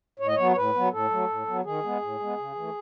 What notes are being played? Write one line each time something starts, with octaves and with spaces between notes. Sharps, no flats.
A2 C#5
D#5
F#3 B3 C#5
C#5
A2 B4
F#3 B3
A2 A4
F#3 A3
A2
F#3 B3
D#3 G#4
G#3 B3
A2
G#3 B3
C#3
E3 A3